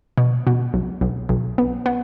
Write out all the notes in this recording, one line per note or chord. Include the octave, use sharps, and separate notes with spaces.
B2
B2
B1
B1
B1
B3
B3